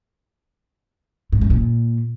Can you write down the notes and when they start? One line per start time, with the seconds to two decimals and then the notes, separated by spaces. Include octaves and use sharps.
1.33 G#2
1.41 F#2
1.50 A#2